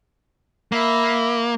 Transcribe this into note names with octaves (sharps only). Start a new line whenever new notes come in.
A#3 E5 B5